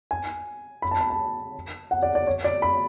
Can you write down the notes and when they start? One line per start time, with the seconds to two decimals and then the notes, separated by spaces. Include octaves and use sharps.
0.11 G#5
0.82 B5
0.91 A5
1.01 B5
1.10 A5
1.91 F#5
2.03 D5
2.15 D5
2.27 C#5
2.44 D5
2.62 B5